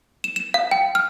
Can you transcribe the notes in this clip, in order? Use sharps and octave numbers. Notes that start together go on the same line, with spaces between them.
E7
E7
F5
G5
F6